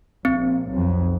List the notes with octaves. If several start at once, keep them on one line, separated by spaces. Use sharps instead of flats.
A#1 C4
B1 F2